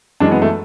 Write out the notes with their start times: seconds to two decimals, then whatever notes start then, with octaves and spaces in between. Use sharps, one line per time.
0.20 F#2 E3 G#3 D4
0.31 B3
0.42 A3